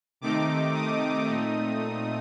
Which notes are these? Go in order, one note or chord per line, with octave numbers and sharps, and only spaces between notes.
C3 D#3 A3 C4 D#4 D6
D#6
A#2 A3 C4 D#4